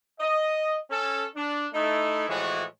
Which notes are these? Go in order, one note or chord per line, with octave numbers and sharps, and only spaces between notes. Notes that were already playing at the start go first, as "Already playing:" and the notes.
D#5
C#4 A4
D4
A3 D#4 E4
A2 E3 F3 G#3 F#4 C#5